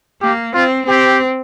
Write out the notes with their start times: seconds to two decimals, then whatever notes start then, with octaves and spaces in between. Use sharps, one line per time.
0.22 A#3 G4
0.54 C4 F4
0.87 C4 G4